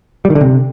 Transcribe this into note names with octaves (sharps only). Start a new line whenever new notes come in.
G3
D#3
D3
C3